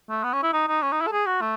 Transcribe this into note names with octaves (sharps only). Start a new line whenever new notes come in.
A3
B3
C#4
E4
D#4
D#4
C#4
D#4
E4
A4
G#4
F#4
A3